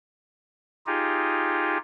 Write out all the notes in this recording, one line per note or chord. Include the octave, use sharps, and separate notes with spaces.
D#4 F4 G4 G#4